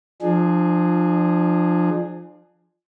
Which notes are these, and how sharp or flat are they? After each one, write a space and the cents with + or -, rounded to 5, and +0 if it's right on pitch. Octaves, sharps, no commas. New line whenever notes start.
F3 +0 D4 +35 G#4 +0